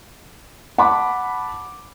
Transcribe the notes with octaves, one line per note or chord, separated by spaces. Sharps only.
F#5 A5 B5 D6